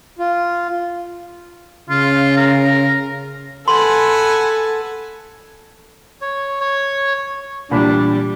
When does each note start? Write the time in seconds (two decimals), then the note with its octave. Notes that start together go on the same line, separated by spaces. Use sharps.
0.19 F4
1.89 C#3 F4
2.37 A#4
3.68 A4 B4 F#5 G#5 C6
6.21 C#5
6.61 C#5
7.71 A#2 E3 G3 D4 B5